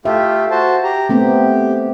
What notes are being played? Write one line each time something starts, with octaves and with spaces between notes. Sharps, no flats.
A3 F4 G4 E5
F#4 C5 A5
G4 A#5
A3 B3 C4 G4